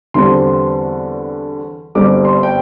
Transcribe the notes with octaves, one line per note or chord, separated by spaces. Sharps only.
E2 D3 G3 C4 C6
G1 G2 G3 C4 D6
C6
G5